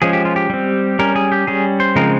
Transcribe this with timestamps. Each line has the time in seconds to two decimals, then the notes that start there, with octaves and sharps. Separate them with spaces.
0.02 F3 G#3 C#4 G#4
0.13 G4
0.25 F4
0.36 G4
0.50 G3 C4
0.99 G3 C#4 A#4
1.16 G#4
1.32 G4
1.47 G3 C#4 G#4
1.80 C5
1.95 C#3 F3 G#3 C4 A#4